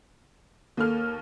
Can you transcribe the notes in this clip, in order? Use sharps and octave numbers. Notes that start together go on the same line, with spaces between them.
D#2 A#3 A4 F6